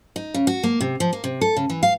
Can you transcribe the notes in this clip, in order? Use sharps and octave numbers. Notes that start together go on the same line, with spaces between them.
D#4
C#3
F#4
A#3
C3
F3
A#3
C3
A4
C#3
E3
F5